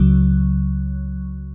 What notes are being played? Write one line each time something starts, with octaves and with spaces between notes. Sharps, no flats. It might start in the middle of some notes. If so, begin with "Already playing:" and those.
Already playing: C#2 C#3 F#3